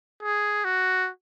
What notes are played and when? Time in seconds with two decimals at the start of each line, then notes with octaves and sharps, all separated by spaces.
0.22 G#4
0.64 F#4